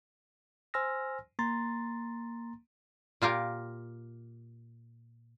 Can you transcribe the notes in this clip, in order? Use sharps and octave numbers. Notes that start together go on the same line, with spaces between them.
C5 G#5 C6 E6 F6 A#6
A#3 A#5 C6 A6
A#2 F4 G4 A#4